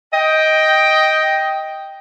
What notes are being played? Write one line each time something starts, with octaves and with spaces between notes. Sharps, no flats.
D#5 G5